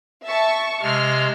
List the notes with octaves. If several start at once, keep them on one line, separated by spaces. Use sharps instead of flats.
E5 A5 C#6
C3 G#3 F6